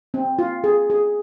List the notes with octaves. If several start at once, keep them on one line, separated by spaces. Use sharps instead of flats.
C4
F4
G#4
G#4